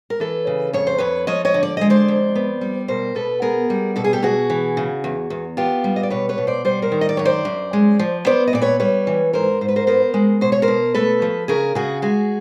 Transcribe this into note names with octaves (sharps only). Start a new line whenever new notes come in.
A#4
E3 A4 B4
C#3
F2 C#5
C5
F2 B4 C#5
F3 C#5 D#5
C#5 D#5
D3
D5
G#3 D#5
C5 D5
F2
B3
G3
B2 A#4 C5
B2 A4 B4
B3 G#4 A#4
G3
B2 A4
G#4
G4 A4
B2 F#4 G#4
E3
C#3
E2
E2
B3 F4 G4
G3
D#5
D5
B2 B4 C#5
B4 C#5
B2
C5 D5
G3 C5 D5
A#4 C5
D#3
D#5
D5
F#2 C#5
C5 D5
F#2
G#3
F3
B3 C5 D5
D#5
A#2 D5
B4 C#5
G3 B4 C#5
E3
G#2 A#4 C5
G#2 C5
B4
A#4 C5
B3 A#4 C5
G#3
B2 C5
C#5
A#4 C5
B2
A3 A4 B4
F3
C#3 G#4 A#4
C#3 F#4 G#4
G#3 F#4 G#4